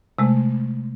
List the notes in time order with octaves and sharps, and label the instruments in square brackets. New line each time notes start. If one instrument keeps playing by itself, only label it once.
[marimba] C3 G#3 A3